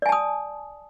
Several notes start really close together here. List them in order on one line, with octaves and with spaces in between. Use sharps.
D5 G#5 A5 D#6